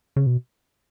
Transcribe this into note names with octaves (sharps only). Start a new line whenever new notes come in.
C#3
B2